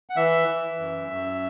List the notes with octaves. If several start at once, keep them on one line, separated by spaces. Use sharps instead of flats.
F#5
E3 E5
E3
F#2
F#2